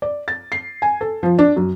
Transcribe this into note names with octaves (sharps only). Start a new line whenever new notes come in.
D5
A6
C7
G#5
A4
F3
D4
F#2